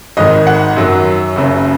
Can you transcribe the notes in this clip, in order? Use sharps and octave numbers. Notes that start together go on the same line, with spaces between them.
G#1 G#2 D#3 D#5
F#5
F#2 D#3 F#3
F#1 F#2 C#3